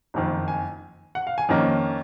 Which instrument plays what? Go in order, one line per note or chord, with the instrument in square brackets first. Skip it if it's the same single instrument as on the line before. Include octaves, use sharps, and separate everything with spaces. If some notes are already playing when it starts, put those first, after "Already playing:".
[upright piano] F#1 F2 D#3
G#5
F#5
F5
G#5
F2 D#3 A#3 C#4 D#5